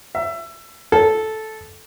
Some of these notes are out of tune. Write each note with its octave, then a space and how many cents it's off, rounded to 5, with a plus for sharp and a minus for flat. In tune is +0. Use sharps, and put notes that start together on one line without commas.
E5 +25
A4 -10